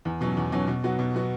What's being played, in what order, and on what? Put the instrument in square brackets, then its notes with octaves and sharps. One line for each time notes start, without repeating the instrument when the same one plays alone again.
[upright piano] E2
B2 F#3 C#4
E2
B2 F#3 C#4
B2
F#3 B3 F#4
B2
F#3 B3 F#4